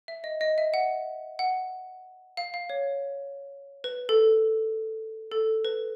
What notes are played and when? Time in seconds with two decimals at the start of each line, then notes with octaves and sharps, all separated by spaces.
0.08 E5
0.24 D#5
0.41 D#5
0.58 E5
0.74 F#5
1.39 F#5
2.37 F5
2.54 F5
2.70 C#5
3.84 B4
4.09 A4
5.32 A4
5.65 B4